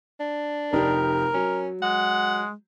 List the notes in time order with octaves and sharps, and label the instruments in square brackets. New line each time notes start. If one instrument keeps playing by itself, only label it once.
[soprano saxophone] D4
[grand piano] F1 D#4 G4 [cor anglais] A#4
[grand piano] F#3 [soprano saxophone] C#4
[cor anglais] G#3 [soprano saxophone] F#5